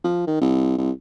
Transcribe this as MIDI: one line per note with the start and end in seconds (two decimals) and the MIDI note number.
0.04 0.25 53
0.27 0.38 51
0.41 0.74 36
0.78 0.91 36